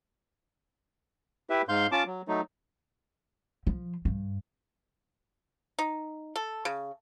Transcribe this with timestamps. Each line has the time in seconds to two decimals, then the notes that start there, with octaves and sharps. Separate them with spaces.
1.50 E4 G4 B4 E5
1.69 G#2 F5 C6 G6
1.92 C#4 F4 A5 D6
2.06 F#3
2.28 F#3 A3 D#4
3.67 F3
4.05 G2
5.79 D#4
6.36 A4
6.65 C#3